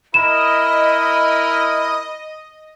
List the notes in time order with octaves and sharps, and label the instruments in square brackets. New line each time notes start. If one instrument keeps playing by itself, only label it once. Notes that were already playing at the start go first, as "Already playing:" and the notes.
[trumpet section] E4 A#4 [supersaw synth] D#5 [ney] B5 [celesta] E7